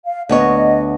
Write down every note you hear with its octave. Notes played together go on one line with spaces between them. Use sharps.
F5
D2 B3 C#5 D#5